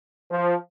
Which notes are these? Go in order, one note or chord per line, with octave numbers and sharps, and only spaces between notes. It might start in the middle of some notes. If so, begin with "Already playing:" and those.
F3